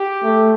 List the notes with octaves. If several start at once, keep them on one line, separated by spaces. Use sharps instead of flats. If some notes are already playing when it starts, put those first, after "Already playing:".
Already playing: G4
A3